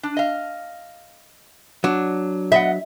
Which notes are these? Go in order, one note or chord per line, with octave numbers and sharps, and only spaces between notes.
D4
D#5 F5
F#3 D4
B3 D#5 E5 F#5